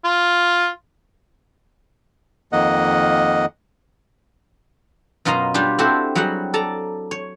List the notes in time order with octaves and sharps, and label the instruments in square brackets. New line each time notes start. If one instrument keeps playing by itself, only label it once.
[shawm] F4
[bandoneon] F2 D#3 A#3 D#5 F#5
[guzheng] F#2 B2 F4 D#5 F5 A#5
G3 D4 F4 G4
C4 E4 F#4 G4 A4 C5
F#3 G3 F#4 G#4 F#5
A4 D5 A5 A#5
C#5